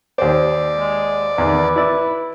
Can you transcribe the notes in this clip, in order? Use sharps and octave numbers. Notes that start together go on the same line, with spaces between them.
D#2 C5 D5
G#3
E2 D#3 B4
E4 D5